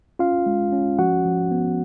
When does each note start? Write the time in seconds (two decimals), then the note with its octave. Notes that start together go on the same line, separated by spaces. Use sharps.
0.19 C#4 F4 F5
0.46 G#3
0.72 C#4
0.99 F3 F#4 F#5
1.25 F3
1.51 B3